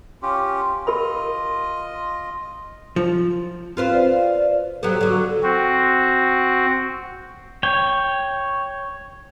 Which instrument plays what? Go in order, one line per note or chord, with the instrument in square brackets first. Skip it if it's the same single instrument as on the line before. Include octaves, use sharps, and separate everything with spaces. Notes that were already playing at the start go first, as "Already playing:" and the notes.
[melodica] C#4 F4 G4
[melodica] F4 D#5 [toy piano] G4 A#4 B5
[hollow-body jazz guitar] F3
[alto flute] C4 [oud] F4 B4 C5
[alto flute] D5
[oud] F#3 G3 B3 [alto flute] A4
[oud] D3 F#3
[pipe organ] C4 F#4
[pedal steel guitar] C#5 G5